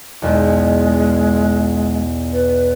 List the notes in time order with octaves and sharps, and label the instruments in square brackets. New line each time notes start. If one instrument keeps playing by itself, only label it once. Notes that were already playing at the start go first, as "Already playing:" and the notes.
[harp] B1 E2 [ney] G#3
[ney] B4